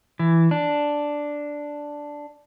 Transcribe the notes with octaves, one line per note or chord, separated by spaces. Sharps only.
E3
D4